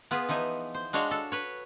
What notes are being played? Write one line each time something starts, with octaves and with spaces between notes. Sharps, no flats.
B3 F4 G#4 B4
E3 F3 D#4 G#5
C5
G#3 D4 F#4 C#5 F5
A4
B4 C#5